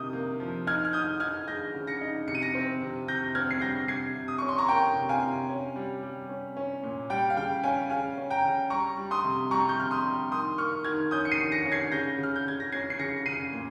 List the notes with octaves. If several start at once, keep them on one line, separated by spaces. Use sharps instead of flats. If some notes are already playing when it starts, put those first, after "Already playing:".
Already playing: C3 A#3 D#4 D#6 G6
A#3
F3
D#4 F6 G#6
F6
D#4 D#6 G6
D#4 F6 G#6
G#3 G6 A#6
C#3
A#6 C#7
D#4
C3 C#7
D#7
A#6 C#7
C4
C3
C3 G6 A#6
C4 F6 G#6
C7
G3 G6 A#6
C3 G#6 C7
C3
D#6
C#4 C#6
C6
A#5 C#6
A#3 G5 A#5
C3
F5 G#5
C3
C#4
G3
G3
C#4
C#4
A#2
G3 G5
F5
C#3 G5
C#4 F5 G#5
C#3 F5 G#5
C#4
G5 A#5
C#3
G3 A#5 C#6
G3
C6 D#6
C3
G3 A#5 C#6
G6
C3 F6
C6 D#6
G3
D#3 C6 D#6
A#3 C#6 F6
D#3 F6 G#6
C#4 D#6 G6
C#7
C7 D#7
D#3
A#6 C#7
C#4
G#6 C7
C#3 G6 A#6
C#3 F6
G6
C#3 G#6
A#6
C#4 G#6 C7
C7
C#3 A#6 C#7
C#3 C7 D#7
A#2